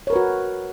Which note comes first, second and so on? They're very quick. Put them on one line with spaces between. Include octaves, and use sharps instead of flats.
C#5 A#4 B4 F#4